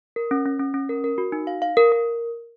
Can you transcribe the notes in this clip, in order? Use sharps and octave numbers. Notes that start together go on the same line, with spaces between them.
A#4
C#4
C#4
C#4
C#4
A#4
A#4
F#4
D#4
F5
F5
A#4
A#4